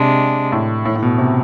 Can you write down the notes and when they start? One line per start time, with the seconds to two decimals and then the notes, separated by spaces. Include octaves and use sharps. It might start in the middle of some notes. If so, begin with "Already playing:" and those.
Already playing: C3 G#3 D4
0.52 A2
0.86 A2
0.96 A2
1.03 B2
1.18 C3